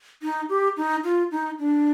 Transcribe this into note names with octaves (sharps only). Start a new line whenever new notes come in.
D#4
G4
D#4
F4
D#4
D4